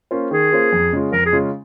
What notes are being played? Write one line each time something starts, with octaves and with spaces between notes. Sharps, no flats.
A#3 C#4 F4 C5
D#3 G#4
A#3 C#4 F4 C5
F2
C#3 G#3 C#4 F4
F2 A#4
G#4
C#3 G#3 C#4 F4